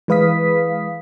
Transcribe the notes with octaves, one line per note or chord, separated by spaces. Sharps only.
E3 G#3 B4 F5 D#6 B6